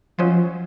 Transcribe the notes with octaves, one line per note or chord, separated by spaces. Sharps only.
F3 F#3 C#4 F4 C5 D#5